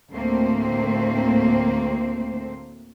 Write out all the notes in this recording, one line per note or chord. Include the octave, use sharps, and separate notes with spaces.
D2 A2 A3 A#3 C4 C5